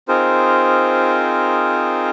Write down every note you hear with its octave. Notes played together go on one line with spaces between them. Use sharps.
C4 D#4 F4 G#4 A#4 C5